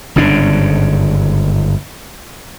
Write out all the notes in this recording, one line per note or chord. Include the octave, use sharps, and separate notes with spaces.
G1 G#2 C#3 D4